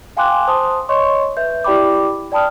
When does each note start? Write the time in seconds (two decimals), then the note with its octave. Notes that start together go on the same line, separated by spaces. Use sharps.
0.17 F5 G5 G#5 C6 D6 F#6
0.47 C5 A5 C6 D#6
0.89 C#5 D#5 C6 C#6
1.37 B4 E5 G6
1.64 E4 G4 D5 G5 B5 D6
2.32 D5 G5 A5 B5 D#6 F6